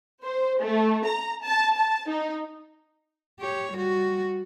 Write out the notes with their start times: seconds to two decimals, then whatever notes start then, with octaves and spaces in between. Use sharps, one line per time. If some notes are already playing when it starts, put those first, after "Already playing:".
0.23 C5
0.62 A3
1.06 A#5
1.45 A5
1.75 A5
2.09 D#4
3.40 G4 C#5
3.73 G3 F#4